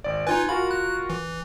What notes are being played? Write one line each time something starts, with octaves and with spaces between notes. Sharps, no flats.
G#1 D5
D#4 F4 B4 G#5
F4 F#4 A#4 B5
F#6
E3